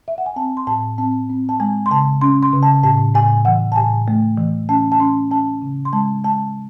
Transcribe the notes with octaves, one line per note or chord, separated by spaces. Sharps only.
E5
F#5
G#5
C4 A5
C6
A2 A5
C4 A5
C4
A5
G#3 G#5
C6
C#3 A5
C#4 C6
C6
C#3
A5
A2 A5
A2 G#5
E3 F#5
A5
A2 G#5
A3
E3
C#4 A5
A5
C#4 C6
C#4 A5
C#3
C6
G#3 A5
G#3 A5